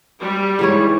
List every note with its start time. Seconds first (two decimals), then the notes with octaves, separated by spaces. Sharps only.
0.20 G3
0.59 G#2 E3 C#5